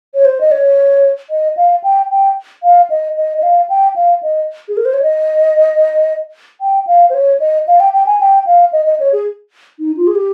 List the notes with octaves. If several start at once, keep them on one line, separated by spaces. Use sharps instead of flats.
C#5
C5
D#5
C#5
D#5
F5
G5
G5
F5
D#5
D#5
D#5
F5
G5
F5
D#5
G#4
A#4
C5
C#5
D#5
G5
F5
C5
C#5
D#5
F5
G5
G5
G#5
G5
F5
D#5
D#5
C#5
G#4
D#4
F4
G#4
G4